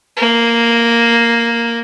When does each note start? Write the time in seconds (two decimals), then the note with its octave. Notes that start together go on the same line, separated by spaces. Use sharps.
0.17 A#3